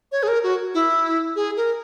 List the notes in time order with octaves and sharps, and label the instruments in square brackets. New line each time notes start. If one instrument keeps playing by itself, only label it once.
[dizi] C#5
G#4
A#4
F#4
E4
G#4
A#4